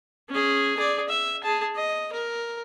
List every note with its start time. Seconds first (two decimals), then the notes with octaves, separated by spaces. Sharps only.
0.30 C#4 G#4
0.77 G#4 D5
1.09 E5
1.43 G#4 A5
1.75 D#5
2.12 A#4